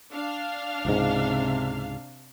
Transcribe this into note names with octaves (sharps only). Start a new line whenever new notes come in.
D4 F5
C#2 G#2 C3